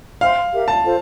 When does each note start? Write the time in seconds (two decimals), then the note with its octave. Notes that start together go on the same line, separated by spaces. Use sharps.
0.21 C5 E5 F5 G5 C6
0.52 G4 A#4 E5
0.68 A5
0.83 F4 A4 C5